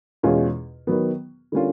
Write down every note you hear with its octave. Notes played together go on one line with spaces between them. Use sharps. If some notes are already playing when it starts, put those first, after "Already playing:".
E2 B2 G#3 C#4 F4
D#3 F#3 B3
D3 G3 A#3 C#4 F4